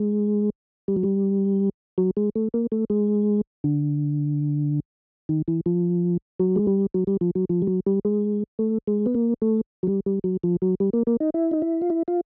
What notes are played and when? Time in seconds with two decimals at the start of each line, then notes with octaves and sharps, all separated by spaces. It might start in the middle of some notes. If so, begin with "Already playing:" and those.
Already playing: G#3
0.88 G3
0.96 F#3
1.03 G3
1.98 F#3
2.17 G#3
2.36 A3
2.54 A#3
2.72 A3
2.90 G#3
3.64 D3
5.29 D#3
5.48 E3
5.66 F3
6.40 F#3
6.56 G#3
6.67 G3
6.94 F#3
7.07 G3
7.21 F3
7.35 F#3
7.49 F3
7.62 G3
7.67 F#3
7.86 G3
8.05 G#3
8.59 A3
8.87 G#3
9.06 B3
9.14 A#3
9.42 A3
9.83 F#3
9.87 G3
10.06 G3
10.24 F#3
10.44 F3
10.62 F#3
10.80 G3
10.93 A#3
11.07 A#3
11.20 D#4
11.34 E4
11.51 D#4
11.62 E4
11.82 F4
11.90 E4
12.08 F4